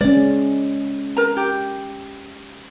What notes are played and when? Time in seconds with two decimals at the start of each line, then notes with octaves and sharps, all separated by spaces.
0.01 G#3 C#4 D5
1.17 A#4 A#5
1.37 G4